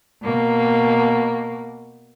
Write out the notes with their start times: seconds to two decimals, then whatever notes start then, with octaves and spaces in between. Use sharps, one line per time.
0.24 B2 A#3